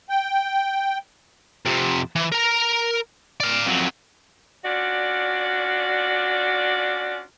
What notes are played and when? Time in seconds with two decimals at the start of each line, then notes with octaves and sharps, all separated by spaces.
0.09 G5
1.66 F2 C3
2.15 E3
2.32 A#4 A#5
3.40 D5 F5
3.66 F2 F#3
4.65 C#4 D4 F4 F#4 D5